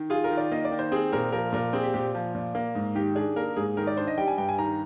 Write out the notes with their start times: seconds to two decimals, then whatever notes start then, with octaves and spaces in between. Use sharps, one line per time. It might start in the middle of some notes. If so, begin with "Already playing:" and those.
Already playing: D#3
0.10 F4 G#4
0.24 A#4
0.31 D#3
0.37 D5
0.51 A#3 D#5
0.65 D5
0.71 D#3
0.79 C5
0.92 C4 G#4
1.13 A#2 A#4
1.32 F3 A#4
1.52 A#2 A#4
1.73 C4 G#4
1.83 G4
1.94 A#2 G4
2.15 F3
2.35 A#2
2.55 A#3
2.75 G#2
2.95 D#3 G4
3.15 D4 G#4
3.36 A#3 A#4
3.57 G#2 G#4
3.77 D#3 A#4
3.87 D5
3.97 D4 C5
4.07 D#5
4.18 G3 G5
4.28 G#5
4.38 G2 G5
4.49 G#5
4.58 D#3 A#5